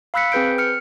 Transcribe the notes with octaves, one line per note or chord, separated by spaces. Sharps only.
F5 B5 E6 F#6 B6 C#7
C4 G#4 B4 G6 D7
F6 C#7